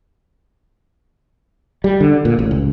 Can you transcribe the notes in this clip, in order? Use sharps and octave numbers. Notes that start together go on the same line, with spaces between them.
G3
D3
A#2
A1
C#2